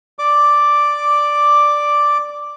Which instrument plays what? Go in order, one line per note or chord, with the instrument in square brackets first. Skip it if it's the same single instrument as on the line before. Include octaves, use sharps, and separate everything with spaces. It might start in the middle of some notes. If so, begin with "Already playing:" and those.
[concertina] D5 D6